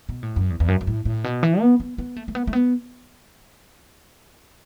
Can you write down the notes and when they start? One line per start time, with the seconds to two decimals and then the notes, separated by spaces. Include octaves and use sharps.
0.09 B2
0.23 A2
0.36 F#2
0.50 E2
0.60 E2
0.68 F#2
0.81 F#2
0.87 A2
1.05 A2
1.24 B2
1.43 E3
1.61 B3
1.80 B3
1.98 B3
2.16 A3
2.28 A3
2.35 B3
2.47 A3
2.53 B3